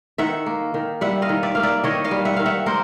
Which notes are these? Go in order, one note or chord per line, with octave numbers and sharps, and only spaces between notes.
D#3 E5 F#5
A#3
D#3
G3 E5 F#5
D#5 F5
D#3
D5 E5
A#3 F5
D5 E5
D#3 C#5 D#5
D#5 F5
G3
E5 F#5
D#3 F5
E5 F#5
A#3 A#4 C5